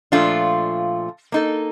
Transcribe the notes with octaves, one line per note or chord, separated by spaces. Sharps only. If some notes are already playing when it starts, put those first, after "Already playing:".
A#2 F3 A3 D4 F4
A#3 D#4 A4